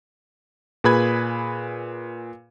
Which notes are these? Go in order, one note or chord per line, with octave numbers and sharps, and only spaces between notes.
A#2 G#4 B4 B5 G#6